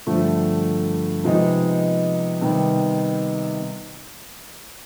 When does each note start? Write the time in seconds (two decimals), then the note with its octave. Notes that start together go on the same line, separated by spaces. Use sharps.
0.07 G2 D3 F3 A3
1.24 C3 F3 G#3 B3 D#4
2.41 C3 D#3 G3 B3 D#4